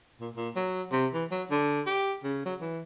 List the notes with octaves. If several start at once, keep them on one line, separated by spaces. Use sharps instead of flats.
A#2
A#2
F#3
C3
E3
F#3
D3
G4
C#3
F#3
E3